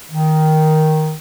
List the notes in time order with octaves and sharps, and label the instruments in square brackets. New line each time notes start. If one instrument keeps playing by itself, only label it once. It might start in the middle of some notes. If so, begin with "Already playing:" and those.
[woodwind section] D#3